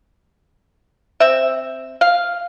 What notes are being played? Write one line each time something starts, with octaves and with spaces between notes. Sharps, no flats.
C4 E5
F5